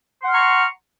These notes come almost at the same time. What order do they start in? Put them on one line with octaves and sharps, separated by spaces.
C6 F#5 F6 C#6 A#5